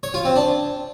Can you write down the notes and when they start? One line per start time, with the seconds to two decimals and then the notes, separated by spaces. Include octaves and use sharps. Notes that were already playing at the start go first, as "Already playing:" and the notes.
0.03 C#5
0.14 F4
0.25 C4
0.36 D4